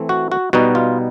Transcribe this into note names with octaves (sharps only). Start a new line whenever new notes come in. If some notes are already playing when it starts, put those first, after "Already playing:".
Already playing: E3 A3 C4
F#4
F#4
B2 G3 B3 D#4 F#4
F4